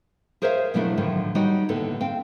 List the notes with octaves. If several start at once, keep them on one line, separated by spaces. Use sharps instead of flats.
G#4 A#4 C5 C#5 E5 F5
B2 F3 F#3 A3 D4 E4
A2 D3 D#3 F3 F#3
G3 D#4 F#4 C#5
D#2 A2 D3 B3 A4
C4 F5 G5